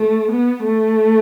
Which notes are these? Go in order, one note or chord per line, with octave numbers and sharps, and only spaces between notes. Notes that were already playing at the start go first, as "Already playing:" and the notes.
Already playing: A3
B3
A3